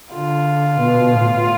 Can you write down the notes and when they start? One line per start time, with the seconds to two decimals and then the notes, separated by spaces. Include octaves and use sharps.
0.14 D3 F4
0.80 B2
1.13 A2